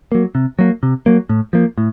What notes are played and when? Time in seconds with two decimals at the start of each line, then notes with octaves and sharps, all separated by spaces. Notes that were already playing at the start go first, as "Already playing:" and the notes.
0.12 F#3 A#3
0.35 C3
0.59 F#3 A#3
0.83 C3
1.06 F#3 A#3
1.29 A2
1.53 F3 A#3
1.78 A2